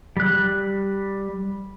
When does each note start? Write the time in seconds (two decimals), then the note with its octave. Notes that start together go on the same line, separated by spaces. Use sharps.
0.17 G3 F#6